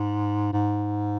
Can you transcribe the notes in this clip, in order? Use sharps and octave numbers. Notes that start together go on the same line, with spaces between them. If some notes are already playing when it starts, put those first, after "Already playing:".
Already playing: G#2
G#2